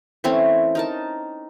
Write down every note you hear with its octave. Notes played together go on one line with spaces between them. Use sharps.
E3 A3 C4 C#4
D#4 A#4 A5